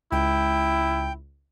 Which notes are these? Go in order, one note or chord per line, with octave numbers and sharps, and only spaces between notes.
C#2 E4 G5